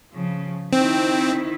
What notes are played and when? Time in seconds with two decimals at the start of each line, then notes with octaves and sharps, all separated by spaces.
0.12 C#3 F3
0.73 D#3 C4 E4